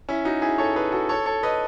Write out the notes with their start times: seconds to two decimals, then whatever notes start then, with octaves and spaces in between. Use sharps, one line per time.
0.09 C#4 E4
0.25 D#4 F#4
0.42 E4 G#4
0.58 A4 C#5
0.76 G#4 B4
0.92 F#4 A4
1.09 A4 C#5
1.26 A4 C#5
1.43 B4 D#5